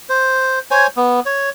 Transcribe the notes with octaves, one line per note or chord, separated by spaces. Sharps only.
C5
C5 C#5 G#5
B3
C#5